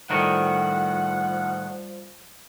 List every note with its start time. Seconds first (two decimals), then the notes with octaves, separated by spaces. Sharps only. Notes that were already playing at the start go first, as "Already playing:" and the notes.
0.10 A2 D#3 F3 G3 F#4 F#5